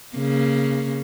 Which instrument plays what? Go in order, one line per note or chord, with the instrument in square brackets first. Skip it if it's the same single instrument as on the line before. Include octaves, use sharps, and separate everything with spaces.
[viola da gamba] C#3 A#3